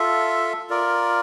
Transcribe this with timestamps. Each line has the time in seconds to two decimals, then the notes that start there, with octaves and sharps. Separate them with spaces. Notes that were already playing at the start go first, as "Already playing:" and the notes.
Already playing: F4 A4 E5
0.70 F4 A#4 D5